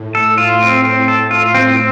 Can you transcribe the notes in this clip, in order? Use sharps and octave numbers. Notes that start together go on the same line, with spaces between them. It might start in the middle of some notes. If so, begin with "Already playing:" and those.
Already playing: A2
A4
F4
C4
C4
A4
F4
A2 C4
C4